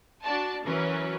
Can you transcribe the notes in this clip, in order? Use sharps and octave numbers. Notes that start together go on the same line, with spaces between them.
D4 F#4 D5 A5
E3 F#3 C#4 A#4 B4